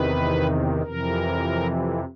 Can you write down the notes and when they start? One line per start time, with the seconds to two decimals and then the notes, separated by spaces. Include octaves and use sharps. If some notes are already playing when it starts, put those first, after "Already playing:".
Already playing: E2 C3 D#3 B4
0.83 F2 C3 E3 A#4